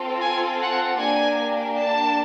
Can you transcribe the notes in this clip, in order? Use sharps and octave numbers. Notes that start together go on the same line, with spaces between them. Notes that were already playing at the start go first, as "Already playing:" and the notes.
Already playing: C4 F4 A4
G#5
F#5
A#3 D4 G4 G#5
A5